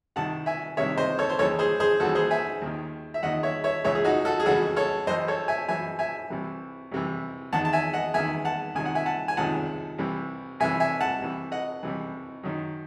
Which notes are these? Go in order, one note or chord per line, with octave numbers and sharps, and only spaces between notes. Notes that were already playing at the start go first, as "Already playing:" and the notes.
C2 C3 D#3 F#5 A5
E5 G#5
C2 C3 D#3 C#5 E5
C5 D#5
A4 C#5
C5
D#2 C#3 E3 A4 C#5
G#4 C5
G#4 C5
D#2 C#3 E3 F#4 A4
G#4 C5
E5 G#5
D#2 D#3
E5
D#2 D#3 D#5 F#5
C#5 E5
C#5 E5
C#2 C#3 E3 C#5 E5
G#4
D#4 F#4
F#4 A4
G#4
C#2 C#3 E3 F#4 A4
A4 C#5
F#2 E3 C5 D#5
A4 C#5
E5 G#5
F#2 E3 E5 G#5
E5 G#5
C2 C3 E3
C2 C3 E3
E2 D#3 F#5 A5
A5
E5 G#5
D#5 F#5
E2 D#3 E5 G#5
F#5 A5
C#2 C3 D#3 G#5
F#5
E5 G#5
F#5 A5
G#5
C#2 C3 D#3 F#5 A5
C2 C3 E3
C2 C3 E3 E5 G#5
E5 G#5
F#5 A5
C2 C3 E3
D#5 F#5
C2 C3 E3
F#2 D#3